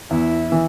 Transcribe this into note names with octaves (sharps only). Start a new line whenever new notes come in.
E2 E4
E3